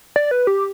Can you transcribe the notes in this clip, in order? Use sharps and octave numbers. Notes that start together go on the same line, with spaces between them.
D5
B4
G4